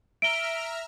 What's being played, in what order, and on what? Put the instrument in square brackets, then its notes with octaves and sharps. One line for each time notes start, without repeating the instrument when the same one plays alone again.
[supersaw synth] E5 A#5 F6 [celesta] D7 G7